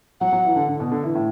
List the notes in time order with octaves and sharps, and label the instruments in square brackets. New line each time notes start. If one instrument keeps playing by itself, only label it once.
[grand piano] F#3 [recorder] F#5
[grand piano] F#3
E3
D3
D3
B2
D3
E3
A2